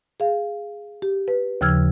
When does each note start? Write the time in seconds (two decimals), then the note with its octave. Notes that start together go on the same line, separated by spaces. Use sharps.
0.20 G#4 F5
1.02 G4
1.28 B4
1.61 D#2 C#3 F3 E6 F6 G#6